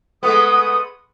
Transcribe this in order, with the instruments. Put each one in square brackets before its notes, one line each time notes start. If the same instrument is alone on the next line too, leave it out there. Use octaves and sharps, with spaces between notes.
[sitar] G#3 A3 B3 [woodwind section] F#5 C#6 D#6